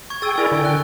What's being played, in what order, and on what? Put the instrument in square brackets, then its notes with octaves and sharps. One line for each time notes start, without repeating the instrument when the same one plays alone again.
[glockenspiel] C#6 G#6
[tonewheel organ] G#4 G5 [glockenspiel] E6 A6
[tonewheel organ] E4 A#4 D5 [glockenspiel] G#5
[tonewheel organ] D3 G5
[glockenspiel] F#6